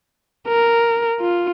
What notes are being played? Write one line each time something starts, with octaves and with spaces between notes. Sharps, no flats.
A#4
F4